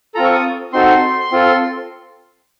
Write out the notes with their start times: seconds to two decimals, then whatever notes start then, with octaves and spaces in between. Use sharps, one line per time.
0.15 C4 F4 A4 A#5
0.25 C#6
0.34 D#6
0.73 C4 D#4 F#4 A4 C6
1.32 C4 F4 A4